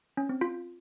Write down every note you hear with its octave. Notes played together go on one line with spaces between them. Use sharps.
C#4
C4
F4